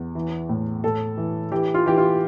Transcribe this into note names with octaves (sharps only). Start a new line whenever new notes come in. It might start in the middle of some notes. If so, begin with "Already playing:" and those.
Already playing: E2
E3
A2
A2 A4
E3
E3 G4
F4
E3 G4
F4